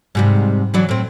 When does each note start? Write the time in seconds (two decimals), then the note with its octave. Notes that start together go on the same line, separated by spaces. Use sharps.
0.15 G#2 C3 G3
0.74 E3 F#3 D4
0.89 A2 C4